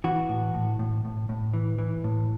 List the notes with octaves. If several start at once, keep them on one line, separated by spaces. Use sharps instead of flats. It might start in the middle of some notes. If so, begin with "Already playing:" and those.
E3 F#4
A2
A2
A2
A2
A2
E3
E3
A2